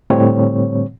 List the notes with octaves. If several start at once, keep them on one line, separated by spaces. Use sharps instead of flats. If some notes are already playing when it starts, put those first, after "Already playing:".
A2 D3 G3 C4 C#5